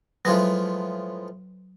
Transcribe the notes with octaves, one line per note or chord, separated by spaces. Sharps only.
A2 F3 F#3 G#3 B3